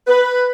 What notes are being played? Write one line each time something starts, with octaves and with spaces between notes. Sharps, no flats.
B4